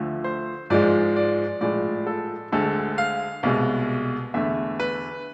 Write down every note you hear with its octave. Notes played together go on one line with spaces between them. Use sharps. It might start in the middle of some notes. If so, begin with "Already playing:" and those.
Already playing: D2 D3 F3 A3
C5
G#2 F3 G#3 D5
D5
A2 F3 G#3 D5
A4
D2 D3 G#3 A4
F5
C2 B2 G#3 F5
E2 D3 A3 E5
B4